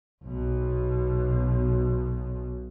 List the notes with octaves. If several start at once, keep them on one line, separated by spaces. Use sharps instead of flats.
B1 B2